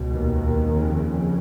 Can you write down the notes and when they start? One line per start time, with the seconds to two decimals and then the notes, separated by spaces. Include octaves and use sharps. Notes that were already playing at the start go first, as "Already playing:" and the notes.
Already playing: C#2 B2
0.12 D#2 D#3
0.72 F2 C#3